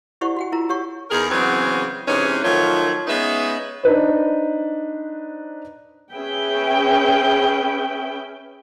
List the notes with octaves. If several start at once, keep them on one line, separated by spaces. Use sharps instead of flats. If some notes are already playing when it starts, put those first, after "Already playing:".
E4 G4 C5 D5 F#5 C#6
F#4 F#5 G5
E4 F4 A#4 A#5
G4 C#5 F#5 C#6
E2 D#4 G#4 A#4
C#3 E3 F#3 B3 C4 G#4
C3 E3 G#3 C#4 D#4 B4
D#3 F3 F#3 A3 F4 C#5
G#3 B3 C#4 D#4 B4 E5
D4 D#4 B4 C5
C#4 G#4 B4 E5 G5